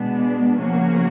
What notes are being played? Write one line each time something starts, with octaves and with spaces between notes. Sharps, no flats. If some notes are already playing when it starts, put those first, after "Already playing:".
Already playing: B2 G#3 B3 D4
C#3 F3 A#3 C#4 F#4